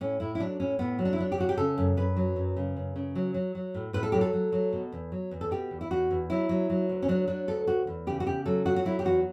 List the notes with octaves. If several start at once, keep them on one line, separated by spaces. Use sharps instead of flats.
A2 C#4
A2 E4
E4
F#3 D4
A2 C#4
A2 B3
F#3
D4
E4
F#3 D4
G4
F#3 F#4
G4
C#3 A4
F#2
F#2 B4
F#3
F#2
C#3
F#2
C#3
F#3
F#3
F#3
A2
A2 B4
A4
F#3 G4
A4
F#3
F#3
B2
E2
F#3
E2
A4
B2 G4
E2
E4
E2 F#4
E2
F#3 E4
F#3
F#3
D2
C#4
F#3 D4
F#3 D4
D2 A4
D2 F#4
E2
C#3 G4
F#4
C#3 G4
F#3 A4
F#3 F#4
F#4
F#3 E4
G4
E2 F#4